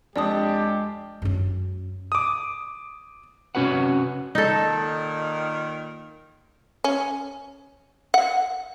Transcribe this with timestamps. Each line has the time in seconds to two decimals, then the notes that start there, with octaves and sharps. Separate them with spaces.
0.16 F2 G#3 D4 G4 D5 A5 D#6
1.22 F#2 C#4
2.12 D6 D#6
3.55 C3 G#3 C#4 F#4 B4 F#5
4.35 A#2 D#3 D#4 A4
6.84 C#4
8.14 F#5